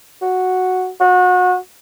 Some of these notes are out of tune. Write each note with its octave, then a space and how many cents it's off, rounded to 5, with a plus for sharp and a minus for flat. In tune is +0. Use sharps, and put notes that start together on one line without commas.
F#4 -5
F#4 -30